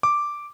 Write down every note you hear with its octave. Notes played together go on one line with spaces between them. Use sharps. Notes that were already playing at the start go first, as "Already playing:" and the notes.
D6